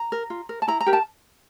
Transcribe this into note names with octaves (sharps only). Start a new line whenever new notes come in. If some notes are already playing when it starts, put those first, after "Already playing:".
Already playing: A#5
A#4
F4
A#4
A5
E4 A#5
A#5
G4 A#4
A5